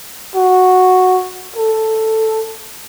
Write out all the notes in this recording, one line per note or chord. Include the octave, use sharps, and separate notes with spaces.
F#4
A4